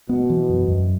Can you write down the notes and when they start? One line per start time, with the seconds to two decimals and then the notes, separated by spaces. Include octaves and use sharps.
0.09 B2 B3
0.30 E3
0.50 F#2
0.68 F#2